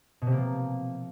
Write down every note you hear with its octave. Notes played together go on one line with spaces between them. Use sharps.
B2
C3
A#3
F3